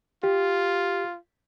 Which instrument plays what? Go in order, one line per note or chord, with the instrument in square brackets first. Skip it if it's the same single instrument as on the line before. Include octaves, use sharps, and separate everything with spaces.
[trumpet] F4 [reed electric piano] G4